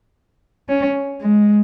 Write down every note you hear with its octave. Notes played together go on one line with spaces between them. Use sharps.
C#4
G#3